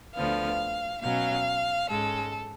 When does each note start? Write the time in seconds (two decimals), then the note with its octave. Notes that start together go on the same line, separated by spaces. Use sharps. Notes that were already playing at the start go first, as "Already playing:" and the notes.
0.15 D2 D3 F3 B3 F5
1.02 B2 F#3 C#4 F5
1.89 G#2 G#3 C#4 A4